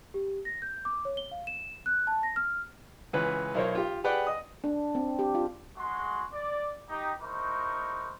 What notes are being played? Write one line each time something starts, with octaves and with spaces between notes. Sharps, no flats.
G4
A#6
G6
D6
C#5
G7
F5
E7
F#6
A5
A#6
F6
C#2 E3 C#4 B4
B1 E4 A#4 C5 C#5
F4 G4
G4 G#4 B4 D5 F#5 G5
D#5 D#6
D4
C4
G4
F4
G#3 F#4 C6
D5
D#4 G4
G#3 D#4 E4 A#4 C5 C#6